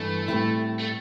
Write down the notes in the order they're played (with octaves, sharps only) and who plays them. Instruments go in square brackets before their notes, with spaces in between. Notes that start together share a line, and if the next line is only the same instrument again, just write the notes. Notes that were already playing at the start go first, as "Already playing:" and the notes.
Already playing: [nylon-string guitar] G2 E3 B3 [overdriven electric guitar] A3
[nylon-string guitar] A2 G3 C4 E4
[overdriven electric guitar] A3